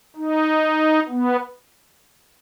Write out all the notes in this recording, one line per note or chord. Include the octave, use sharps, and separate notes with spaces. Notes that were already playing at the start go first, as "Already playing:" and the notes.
D#4
B3